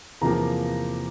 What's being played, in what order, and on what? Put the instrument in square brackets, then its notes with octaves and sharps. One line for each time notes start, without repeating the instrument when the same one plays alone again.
[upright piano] E2 C3 F3 A#3 A#5